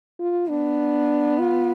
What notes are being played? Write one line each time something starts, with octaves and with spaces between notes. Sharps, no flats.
F4
B3 D4
F4